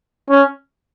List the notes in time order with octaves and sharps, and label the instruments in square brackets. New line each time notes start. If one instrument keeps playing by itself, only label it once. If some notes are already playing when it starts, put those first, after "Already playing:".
[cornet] C#4